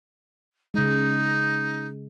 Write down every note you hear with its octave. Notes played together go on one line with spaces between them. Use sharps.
C#3 G#3 D#4